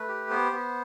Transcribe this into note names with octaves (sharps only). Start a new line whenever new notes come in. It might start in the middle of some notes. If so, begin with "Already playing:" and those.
Already playing: A3 B4
G4
B3 C5
B3